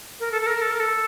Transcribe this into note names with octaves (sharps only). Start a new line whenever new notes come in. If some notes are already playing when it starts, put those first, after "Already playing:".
A#4
A4
A4
A#4
A4
A#4
A4